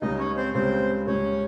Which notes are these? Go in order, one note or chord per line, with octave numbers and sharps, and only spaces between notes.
C#2 C#3 G3 D#4 D#5
C#4 C#5
C4 C5
C#2 C#3 G3 C4 C5
C#2 C#3 G3 C#4 C#5